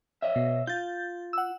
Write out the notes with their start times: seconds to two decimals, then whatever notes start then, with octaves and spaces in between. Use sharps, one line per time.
0.22 C#5 D#5 E5
0.36 B2
0.67 F4 G6 A6
1.33 F#5 E6